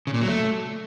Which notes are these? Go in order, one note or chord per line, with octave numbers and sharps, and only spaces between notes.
C#3
A#2
F#3
A3